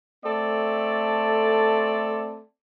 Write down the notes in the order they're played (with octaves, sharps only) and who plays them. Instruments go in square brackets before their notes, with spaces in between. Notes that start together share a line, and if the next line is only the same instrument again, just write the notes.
[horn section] A3 C4 A4 D5